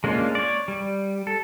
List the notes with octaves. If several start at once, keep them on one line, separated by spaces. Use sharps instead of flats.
G#3 A#3 C#4 D4 F4
C#5 D5
G3
A4